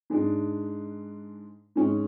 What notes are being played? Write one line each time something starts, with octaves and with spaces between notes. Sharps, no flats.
G#2 G#3 D4
G#2 G#3 C#4